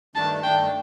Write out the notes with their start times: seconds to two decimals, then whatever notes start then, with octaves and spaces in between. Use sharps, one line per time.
0.15 G2 D#3 A3 D4 A5
0.44 G2 D#3 A3 D4 G5